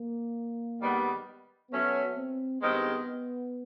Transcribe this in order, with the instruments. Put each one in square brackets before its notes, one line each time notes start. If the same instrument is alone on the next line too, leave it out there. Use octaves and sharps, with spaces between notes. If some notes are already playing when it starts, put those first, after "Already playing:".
Already playing: [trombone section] A#3
[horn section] G#2 D#3 G3 B3
[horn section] F#3 A3 C#4 [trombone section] B3
[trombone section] C4
[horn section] G2 D#3 G#3 C4 D#4 [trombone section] B3